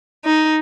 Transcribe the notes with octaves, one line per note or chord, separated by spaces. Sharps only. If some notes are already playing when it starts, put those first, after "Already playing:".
D#4